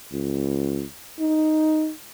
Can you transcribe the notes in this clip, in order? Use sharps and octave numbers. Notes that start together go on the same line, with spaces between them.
C#2
D#4